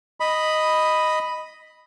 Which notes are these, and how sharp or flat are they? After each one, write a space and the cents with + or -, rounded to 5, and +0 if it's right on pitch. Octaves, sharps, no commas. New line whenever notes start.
D#5 +0 B5 +0